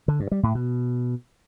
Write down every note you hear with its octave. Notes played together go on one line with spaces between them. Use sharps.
D3
G2
G3
A2
B2